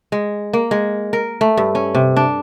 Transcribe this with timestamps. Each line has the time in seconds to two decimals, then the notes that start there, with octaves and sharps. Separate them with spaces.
0.12 G#3
0.53 A#3
0.71 G#3
1.13 A#4
1.41 A3
1.57 G2
1.75 C#4
1.95 C3
2.16 D4